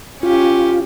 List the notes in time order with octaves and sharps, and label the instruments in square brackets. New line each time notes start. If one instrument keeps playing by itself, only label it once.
[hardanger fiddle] C#4 G4 [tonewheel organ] F4